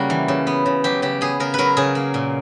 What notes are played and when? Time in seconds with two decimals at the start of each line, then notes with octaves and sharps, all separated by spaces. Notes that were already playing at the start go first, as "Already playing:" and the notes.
Already playing: C#3 G3 A#3 F#4
0.10 E3
0.28 C#3
0.47 B3
0.66 C#3
0.84 F#3 G4
1.02 C#3 G4
1.21 B3 G#4
1.40 C#3 A#4
1.54 F#3 A#4 B4
1.77 C#3 G#4
1.95 A#3
2.14 A#2